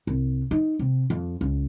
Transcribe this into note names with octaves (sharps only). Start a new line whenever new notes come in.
C2
D#4
C3
F2
C#2